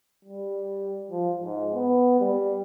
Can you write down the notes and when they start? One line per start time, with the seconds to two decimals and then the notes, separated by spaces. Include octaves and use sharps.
0.25 G3
1.11 F3
1.41 G#2
1.74 B3
2.20 G3